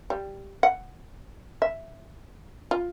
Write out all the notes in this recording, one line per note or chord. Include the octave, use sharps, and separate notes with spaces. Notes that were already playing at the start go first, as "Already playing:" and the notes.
G3
F#5
E5
F4